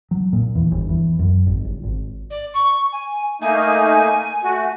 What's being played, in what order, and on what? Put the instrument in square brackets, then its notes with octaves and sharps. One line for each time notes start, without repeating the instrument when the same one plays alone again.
[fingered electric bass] F#3
A#2
E2
G1
E2
F#2
G#1
G1
G#1
[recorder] D5
C#6
G#5
[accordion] A3 A#3 D#4 [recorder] G#5
[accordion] A3 F#4